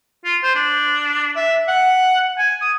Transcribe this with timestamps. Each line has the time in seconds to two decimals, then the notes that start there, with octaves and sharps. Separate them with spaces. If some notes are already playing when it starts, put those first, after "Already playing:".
0.25 F4
0.43 C5
0.55 D4
1.35 E5
1.68 F#5
2.38 G#5
2.61 D#6